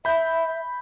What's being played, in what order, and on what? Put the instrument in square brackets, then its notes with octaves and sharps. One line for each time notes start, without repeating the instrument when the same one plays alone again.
[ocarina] E5 [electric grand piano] B5 G6